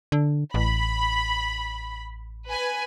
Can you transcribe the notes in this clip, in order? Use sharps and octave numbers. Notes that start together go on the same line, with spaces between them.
D3
A1 B5
B4 G#5